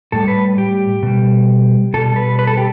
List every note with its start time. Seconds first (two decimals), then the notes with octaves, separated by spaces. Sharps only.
0.12 A2 G3 A4
0.28 B4
0.58 G4
1.03 B2 G3
1.94 B2 G3 A4
2.16 B4
2.39 B4
2.47 A4
2.57 G4